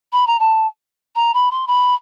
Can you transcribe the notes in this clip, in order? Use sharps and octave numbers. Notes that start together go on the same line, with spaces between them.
B5
A#5
A5
A#5
B5
C6
B5